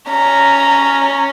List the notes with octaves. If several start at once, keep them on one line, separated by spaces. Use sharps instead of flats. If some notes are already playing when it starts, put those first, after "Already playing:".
C#4 A#5